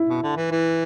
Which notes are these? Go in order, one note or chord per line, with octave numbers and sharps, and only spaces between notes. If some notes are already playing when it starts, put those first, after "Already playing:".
Already playing: E4
B2
D3
E3
E3